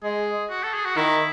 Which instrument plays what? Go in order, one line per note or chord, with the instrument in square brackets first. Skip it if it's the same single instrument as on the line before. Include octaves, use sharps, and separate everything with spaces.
[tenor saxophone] G#3 [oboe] G#4
[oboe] F#4
A4
G#4
F#4
[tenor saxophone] D#3 [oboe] E4